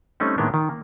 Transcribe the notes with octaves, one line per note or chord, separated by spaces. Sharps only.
G3 A3 C4 C#4 D#4
A2 D#3 G#3 A#3 B3 D4
D#3
A#3